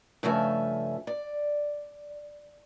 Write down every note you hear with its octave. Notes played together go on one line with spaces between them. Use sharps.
G2 C#3 F3 A3 E5 G#5
D5